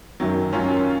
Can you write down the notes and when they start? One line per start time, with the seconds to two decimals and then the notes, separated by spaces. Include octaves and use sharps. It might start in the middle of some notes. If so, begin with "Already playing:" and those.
0.20 F#2 D#3 F#3
0.53 F#2 D#3 F#3 C#4 F4